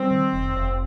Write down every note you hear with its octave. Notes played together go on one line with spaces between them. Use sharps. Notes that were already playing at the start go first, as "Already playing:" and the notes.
Already playing: G3 C4
D#3
F1
F1